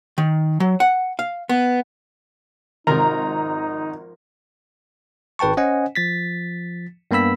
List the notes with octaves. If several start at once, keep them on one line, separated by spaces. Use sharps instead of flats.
D#3
F#3
F#5
F5
B3
G#1 C3 D#3 F3 D#4 F4 A#4 A#5
G#1 B4 G5 A5 C#6
C#4 C5 D#5 F#5 G#5
F3 A6 B6
G2 A#3 B3 B5 E6 B6